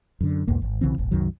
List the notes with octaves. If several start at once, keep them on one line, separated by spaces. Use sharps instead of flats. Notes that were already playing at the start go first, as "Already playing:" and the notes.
F#2 D3
B1 E2 G#2 A#3
G#1
B1 C#3 E3 C4
D#1 G#1
C2 F#2 D#3 F#3